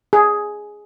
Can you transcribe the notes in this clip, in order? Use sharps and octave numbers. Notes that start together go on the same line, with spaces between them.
G#4